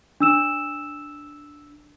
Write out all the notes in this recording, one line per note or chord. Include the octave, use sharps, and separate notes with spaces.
D4 E6 E7